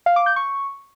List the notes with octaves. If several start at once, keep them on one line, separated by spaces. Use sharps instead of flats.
F5
D6
G6
C#6